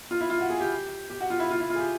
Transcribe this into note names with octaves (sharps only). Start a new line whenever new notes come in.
F4
E4
F4
F#4
G#4
G4
G4
F#4
F4
E4
F4
E4
F4
G#4
G4